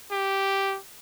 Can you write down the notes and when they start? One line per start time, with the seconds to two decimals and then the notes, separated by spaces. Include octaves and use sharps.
0.11 G4